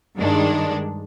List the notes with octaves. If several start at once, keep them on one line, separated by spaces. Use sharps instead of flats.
G2 D#3 G#3 D4